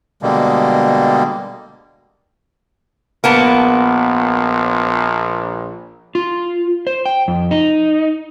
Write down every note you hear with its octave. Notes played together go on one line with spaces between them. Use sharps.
B2 D3 G3 G#3 A#3
A#1 A#3 B3 A5
F4
C5
G5
F2
D#4